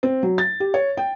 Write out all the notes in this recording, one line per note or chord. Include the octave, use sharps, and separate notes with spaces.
C4
F#3
A6
G4
C#5
G5